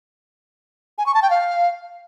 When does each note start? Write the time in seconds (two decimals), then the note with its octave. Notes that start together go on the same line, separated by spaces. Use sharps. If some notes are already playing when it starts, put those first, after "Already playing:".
0.98 G#5
1.06 C#6
1.14 A5
1.22 G5
1.30 F5